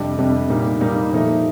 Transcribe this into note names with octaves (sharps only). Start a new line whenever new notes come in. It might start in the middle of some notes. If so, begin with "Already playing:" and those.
Already playing: F2 C3 G3 D4
F2 C3 G3 D4
A#2 G3 A#3 D#4
A#2 G3 A#3 D#4
A#2 F3 A3 D#4